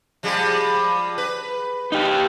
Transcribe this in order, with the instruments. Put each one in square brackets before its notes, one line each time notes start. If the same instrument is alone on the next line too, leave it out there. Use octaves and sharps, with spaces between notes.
[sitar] F3 G3 G#3
B4
[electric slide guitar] D#4 G4